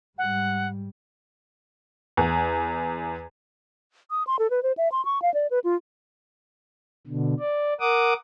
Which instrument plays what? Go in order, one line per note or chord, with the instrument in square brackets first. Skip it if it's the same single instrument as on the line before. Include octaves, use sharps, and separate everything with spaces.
[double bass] G#2 G3 [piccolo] F#5
[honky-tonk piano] E2
[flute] D#6
C6
A4
B4
C5
E5
C6
C#6
F5
D5
B4
F4
[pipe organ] B2 D3
D5
A#4 F#5 D6 D#6